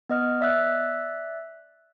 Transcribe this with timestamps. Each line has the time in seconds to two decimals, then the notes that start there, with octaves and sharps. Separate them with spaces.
0.09 B3 D#5 F6
0.41 D5 E5 E6 F#6